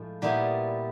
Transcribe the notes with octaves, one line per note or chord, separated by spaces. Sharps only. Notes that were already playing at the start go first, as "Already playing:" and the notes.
Already playing: A2 F3 G#3
A#2 G3 B3 E4 G#4